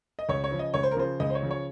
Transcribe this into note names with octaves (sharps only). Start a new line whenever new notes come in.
D#5
C#2 C#5
C#5
C#3 F3
D#5
C#2 C#5
C5
A#4
C#3 F3 C5
C#2 D#5
C5
C#5
C#3 F3
C#5